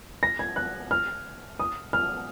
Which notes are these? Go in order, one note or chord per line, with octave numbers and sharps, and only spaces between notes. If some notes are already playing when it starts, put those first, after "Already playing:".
A#6
G#6
F#6
F6
D#6
F6